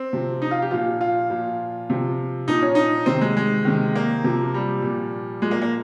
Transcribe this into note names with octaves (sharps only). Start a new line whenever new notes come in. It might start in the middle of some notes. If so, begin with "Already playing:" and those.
Already playing: C4
C3 F3
D#4
F4
G4
A#2 F3 F4
F4
A#2 F3
C3 F3
A#2 F3 D#4
C#4
D#4
C3 D#3 C4
G#3
G#3
C3 D#3
A#3
C3 F3
G3
A#2 F3
A#2 F3 G#3
A#3
A#3